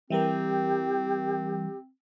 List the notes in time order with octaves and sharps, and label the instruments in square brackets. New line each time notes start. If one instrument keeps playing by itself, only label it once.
[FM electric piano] E3 G3 A#4 [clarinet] C4 [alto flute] G4